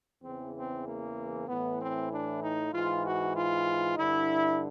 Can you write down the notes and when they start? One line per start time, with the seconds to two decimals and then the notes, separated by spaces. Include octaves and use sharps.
0.22 E2 C#3 E3 C4
0.54 C4
0.85 A#3
1.48 A2 E3 B3
1.79 C4
2.11 D4
2.42 D#4
2.73 G#2 E3 F4
3.05 F#4
3.35 F4
3.97 G2 D3 E4